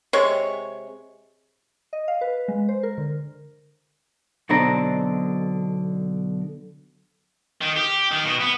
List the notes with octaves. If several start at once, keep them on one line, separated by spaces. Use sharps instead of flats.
C3 G#3 C#5
D#5
F5
B4
G#3
C5
A#4
D3
B1 B2 D3 C4 D4 A#5
D#3
G4
D#3
B2
B3